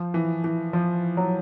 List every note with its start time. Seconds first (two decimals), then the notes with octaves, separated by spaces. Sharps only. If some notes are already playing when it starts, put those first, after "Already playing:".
Already playing: F3
0.14 E3
0.44 E3
0.73 F3
1.17 F#3